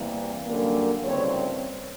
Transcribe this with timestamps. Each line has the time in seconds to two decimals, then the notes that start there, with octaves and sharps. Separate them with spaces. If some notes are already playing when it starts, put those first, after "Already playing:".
Already playing: E2 C3 E3 G3 A#3
0.47 F#2 D3 G3 A#3
1.04 D2 C#3 E3 G3 C4 C#5